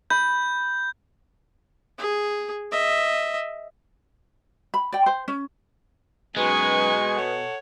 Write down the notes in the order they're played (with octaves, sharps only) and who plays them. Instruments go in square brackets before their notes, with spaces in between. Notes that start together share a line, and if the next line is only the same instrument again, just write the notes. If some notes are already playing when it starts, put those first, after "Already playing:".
[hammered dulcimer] B5 [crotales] G6
[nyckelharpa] G#4
D#5 E5
[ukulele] B5
D5 G5
C5
C#4
[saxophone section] F#2 D#4 B4 [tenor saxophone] B2 [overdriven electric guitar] G#3 [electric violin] G#5 C#6
[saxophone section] A4 C#5 F#5